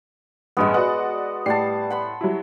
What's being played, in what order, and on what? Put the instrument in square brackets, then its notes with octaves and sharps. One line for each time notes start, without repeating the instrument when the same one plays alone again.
[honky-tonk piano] A1 G2 [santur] G#3 B3
[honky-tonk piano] F#4 D5 F#5 [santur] B4
[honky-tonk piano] A2 C7 [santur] G3 F#5 A5
[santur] F#5 B5 C6
[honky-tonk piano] F#3 G3 E4